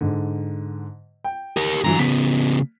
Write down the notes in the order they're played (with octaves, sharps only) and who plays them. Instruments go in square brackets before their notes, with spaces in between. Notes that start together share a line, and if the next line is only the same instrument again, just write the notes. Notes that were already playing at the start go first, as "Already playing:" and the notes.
[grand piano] G#2 D3
G5
[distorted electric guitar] G4 A#4
[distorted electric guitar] G2 A#5 [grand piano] D3 E3 F#3
[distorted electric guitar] C#3 B3 [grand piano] B6